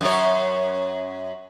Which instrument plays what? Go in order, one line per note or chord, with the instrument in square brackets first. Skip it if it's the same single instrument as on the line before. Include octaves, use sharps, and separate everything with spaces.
[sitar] F#2 C#5